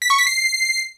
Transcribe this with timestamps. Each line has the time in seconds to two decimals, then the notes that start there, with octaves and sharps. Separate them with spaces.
0.02 B6
0.10 C#6
0.18 B6
0.27 C7